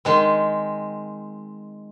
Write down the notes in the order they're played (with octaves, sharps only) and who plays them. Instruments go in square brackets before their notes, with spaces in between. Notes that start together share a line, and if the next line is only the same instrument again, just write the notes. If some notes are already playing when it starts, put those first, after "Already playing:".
[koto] D#3 G#3 C4